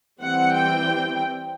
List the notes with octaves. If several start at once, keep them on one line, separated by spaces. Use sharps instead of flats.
E3 G3 C4 F#5
G5